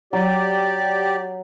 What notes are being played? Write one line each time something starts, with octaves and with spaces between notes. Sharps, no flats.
F#3 G4 D5